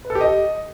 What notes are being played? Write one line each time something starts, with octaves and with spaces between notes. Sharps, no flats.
B4
A4
G4
D#5